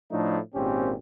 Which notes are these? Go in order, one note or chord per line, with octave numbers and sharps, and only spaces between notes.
A2 F3 A3 D4 D#4
G#1 A#2 C4 C#4 G4